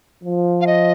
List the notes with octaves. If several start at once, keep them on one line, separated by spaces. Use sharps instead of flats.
F3
F5
D#5